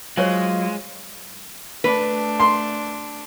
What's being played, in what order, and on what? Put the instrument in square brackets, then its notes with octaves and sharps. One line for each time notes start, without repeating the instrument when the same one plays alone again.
[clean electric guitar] F#3 [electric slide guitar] G#3 [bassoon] F4 [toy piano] C5 C#5 G#5
[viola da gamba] A3 D4 [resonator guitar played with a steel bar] B4
[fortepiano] C6